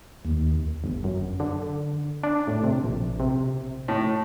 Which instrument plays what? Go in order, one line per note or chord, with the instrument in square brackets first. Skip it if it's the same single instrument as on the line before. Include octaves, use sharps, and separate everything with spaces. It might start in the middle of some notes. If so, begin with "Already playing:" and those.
[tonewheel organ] D#2
[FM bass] G1
F#2
D3
D4
A2
C3
A#1
C3
[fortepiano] A2